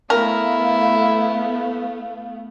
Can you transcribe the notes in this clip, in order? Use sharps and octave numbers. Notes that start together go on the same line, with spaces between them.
A3 B3 E4 A#4 F5